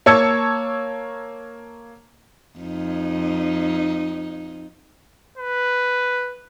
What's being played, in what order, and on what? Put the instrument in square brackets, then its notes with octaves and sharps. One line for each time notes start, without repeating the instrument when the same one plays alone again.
[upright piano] A#3 C#5 A5 E6 G#6 C#7
[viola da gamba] F2 D#4
[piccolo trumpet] B4